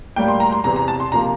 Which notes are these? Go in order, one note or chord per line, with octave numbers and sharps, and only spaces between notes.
A2 G3 A#3 G5
C6
A#5
C6
E2 C3 E3 A#5
A#5
A5
C6
C3 F3 A#3 A#5